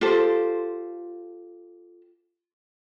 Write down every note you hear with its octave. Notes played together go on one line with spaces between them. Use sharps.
F4 G4 A4 C5